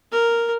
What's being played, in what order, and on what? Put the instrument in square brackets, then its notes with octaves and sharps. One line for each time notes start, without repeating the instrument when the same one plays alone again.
[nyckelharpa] A#4